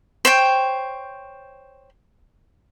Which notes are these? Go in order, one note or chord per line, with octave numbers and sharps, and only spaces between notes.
C5 C#5 G5